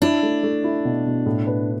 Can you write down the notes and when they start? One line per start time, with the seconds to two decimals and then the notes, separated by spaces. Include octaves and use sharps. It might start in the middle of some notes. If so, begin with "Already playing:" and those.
0.02 D4 E4
0.23 A3
0.43 A3
0.64 E4
0.85 B2
1.06 B2
1.26 A2
1.47 B4